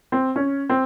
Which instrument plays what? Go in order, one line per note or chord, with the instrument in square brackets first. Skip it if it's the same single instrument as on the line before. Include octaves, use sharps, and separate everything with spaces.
[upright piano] C4
C#4
C4